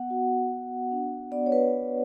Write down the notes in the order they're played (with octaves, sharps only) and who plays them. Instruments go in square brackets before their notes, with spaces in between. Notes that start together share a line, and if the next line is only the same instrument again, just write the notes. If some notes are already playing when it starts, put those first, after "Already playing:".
Already playing: [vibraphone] B3 F#5
F#4
F#4
D4
B3 D5
C#5
B4